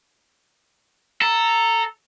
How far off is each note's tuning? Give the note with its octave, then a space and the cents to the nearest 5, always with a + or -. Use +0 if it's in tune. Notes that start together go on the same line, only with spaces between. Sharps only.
A4 +0 A#5 -15